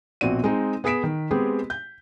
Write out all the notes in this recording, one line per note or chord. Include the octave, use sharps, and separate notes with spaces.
A#1 B2 C4 F#4 D5 D#7
G#3 C4 D#4
B3 G#4 D#6 B6 D7 E7
D#3
G#3 B3 C4 G4 G#4
G6